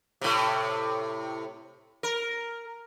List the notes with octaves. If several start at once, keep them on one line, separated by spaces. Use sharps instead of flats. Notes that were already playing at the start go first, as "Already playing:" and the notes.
A2 C3
A#4